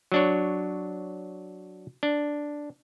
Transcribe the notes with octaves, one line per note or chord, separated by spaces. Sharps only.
F#3 D4 C#5
D4